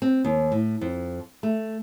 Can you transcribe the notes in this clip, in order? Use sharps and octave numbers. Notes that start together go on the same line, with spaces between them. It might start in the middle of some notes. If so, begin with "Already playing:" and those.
C4
D#2
A2
F2
A3